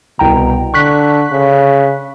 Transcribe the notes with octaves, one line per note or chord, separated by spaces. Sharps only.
C2 B2 G5 A#5
D3 C#6 F#6 B6
C#3